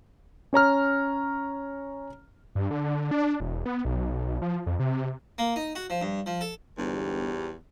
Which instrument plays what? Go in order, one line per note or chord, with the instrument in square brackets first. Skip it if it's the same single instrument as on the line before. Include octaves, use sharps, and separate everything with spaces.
[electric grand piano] C#4 C#5 A#5 F6
[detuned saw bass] G2
D3
D4
E1
B3
B1
F3
F2
C3
[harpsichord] A#3
D#4
F#4
F3
G2
F3
A4
[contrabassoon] G1 [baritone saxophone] E2 [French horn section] G#2 G3 G4